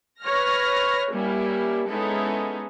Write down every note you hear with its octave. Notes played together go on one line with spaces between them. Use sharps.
B4 C#5 F6 A#6
G3 A#3 C#4 E4
G#3 B3 C#4 D#4 E4 A4